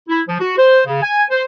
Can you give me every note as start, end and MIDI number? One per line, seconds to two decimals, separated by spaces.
0.09 0.21 64
0.28 0.36 53
0.40 0.55 66
0.58 0.81 72
0.86 1.02 49
1.03 1.24 80
1.30 1.43 72